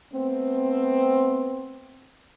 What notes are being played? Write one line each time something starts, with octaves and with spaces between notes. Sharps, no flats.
A3 B3 C4